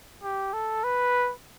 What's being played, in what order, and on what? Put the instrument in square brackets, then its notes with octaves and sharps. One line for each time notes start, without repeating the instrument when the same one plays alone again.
[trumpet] G4
A4
B4